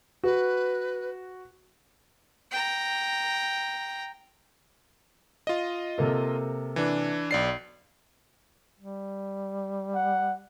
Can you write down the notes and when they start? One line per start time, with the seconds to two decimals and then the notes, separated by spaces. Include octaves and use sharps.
0.24 F#4 B4
2.52 G5 A#5
5.47 F4 D#5
5.98 C3 A#3 A4
6.76 E3 D4
7.31 B1 D5 C7
8.80 G3
9.95 F#5